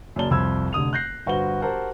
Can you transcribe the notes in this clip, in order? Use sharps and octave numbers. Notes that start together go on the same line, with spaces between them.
F#2 C#3 A#3 D5 A5 G7
C2 F2 C4 B5 E6 G#6
F1 D3 D#6 F7
F#6 G6 A#6 C7
G1 F#4 B4 C5 G7
F#4 G4 A#4 C5 F#5 A5